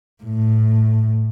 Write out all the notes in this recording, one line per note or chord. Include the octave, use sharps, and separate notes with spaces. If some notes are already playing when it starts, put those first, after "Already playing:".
A2